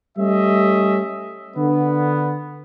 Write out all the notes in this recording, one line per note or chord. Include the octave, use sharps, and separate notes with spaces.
G3 A3 C#4 D#5 E5
D3 B3